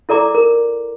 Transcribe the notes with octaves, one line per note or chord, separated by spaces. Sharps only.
E4 A4 D5 A#5 D6
A#4